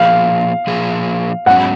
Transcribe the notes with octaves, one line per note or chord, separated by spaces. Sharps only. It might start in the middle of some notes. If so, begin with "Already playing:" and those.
Already playing: A#2 F3 G#4 F5
A#2 F3 G#4
G#2 F#3 C#4 F#5